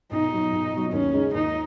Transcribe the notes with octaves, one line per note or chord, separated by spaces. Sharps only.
B1 D#4
B2 F#3
B1
B2 F#3
D#2 C#4
C#3 G#3 D#4 G#4
D#2 D#4